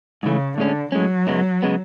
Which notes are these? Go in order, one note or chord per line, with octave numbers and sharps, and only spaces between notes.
G#2 C#3 E3 A3
A2 D3 G#3 C#4
A2 F#3 G#3 C#4
F#2 C#3 G#3 B3
C#3 G#3 B3